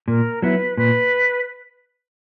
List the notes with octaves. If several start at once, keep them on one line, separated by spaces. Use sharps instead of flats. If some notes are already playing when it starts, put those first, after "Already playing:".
A#2 A#4
F#3 B3 E4 B4
A#2 B4